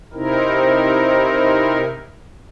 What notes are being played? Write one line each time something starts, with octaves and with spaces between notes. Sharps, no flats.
C3 C4 D#4 E4 A#4